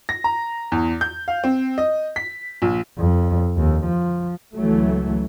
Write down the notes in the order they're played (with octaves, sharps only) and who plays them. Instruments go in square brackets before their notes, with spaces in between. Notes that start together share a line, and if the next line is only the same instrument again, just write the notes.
[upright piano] A#6
A#5
E2
G6
F5
C4
D#5
B6
A#1
[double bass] F2
D#2
F3
[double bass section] C#2 E3 F#3 A3